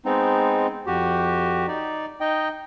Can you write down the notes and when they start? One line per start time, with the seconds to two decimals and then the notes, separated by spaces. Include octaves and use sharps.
0.05 G#3 B3 C4 D#4
0.87 F2 F#4 G4
1.68 D#4 D5
2.20 D#4 D#5 G5